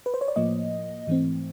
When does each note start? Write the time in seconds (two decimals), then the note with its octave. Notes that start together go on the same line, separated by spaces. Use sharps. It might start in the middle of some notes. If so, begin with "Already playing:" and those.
0.06 B4
0.14 C5
0.21 C#5
0.28 D5
0.36 A2 F3 A#3 D#5
1.07 G#2 E3 A3 C4